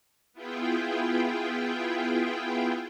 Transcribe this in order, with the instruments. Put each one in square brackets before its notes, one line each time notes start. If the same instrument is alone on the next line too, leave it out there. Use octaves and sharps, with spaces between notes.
[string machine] B3 E4 F4 G#4 G5